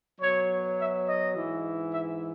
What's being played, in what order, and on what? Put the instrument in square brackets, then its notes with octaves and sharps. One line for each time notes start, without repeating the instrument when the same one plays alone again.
[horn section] B2 F#3 C#5
E5
D#5
G#2 E3
E5